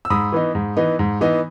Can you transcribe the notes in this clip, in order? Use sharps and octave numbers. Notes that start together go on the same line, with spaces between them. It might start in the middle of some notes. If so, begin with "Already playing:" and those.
E6
G#2 B5 D#6
E3 B3 D#4
G#2
E3 B3 D#4
G#2
E3 B3 D#4